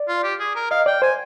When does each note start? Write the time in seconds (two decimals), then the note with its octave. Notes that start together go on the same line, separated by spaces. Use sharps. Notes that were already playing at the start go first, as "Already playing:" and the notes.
Already playing: D5
0.08 F4
0.23 G4
0.40 G#4
0.55 A#4
0.71 D#5 F5
0.86 D5 G5
1.02 C5 G#5